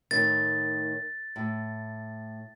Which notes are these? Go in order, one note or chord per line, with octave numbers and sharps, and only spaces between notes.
A2 D#3 A6
A2